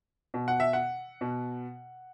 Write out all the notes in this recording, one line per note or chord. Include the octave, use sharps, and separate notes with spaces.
B2
F#5
E5
F#5
B2